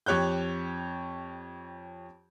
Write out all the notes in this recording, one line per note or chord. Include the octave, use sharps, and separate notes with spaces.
F2 G4 C#5 F#6 G6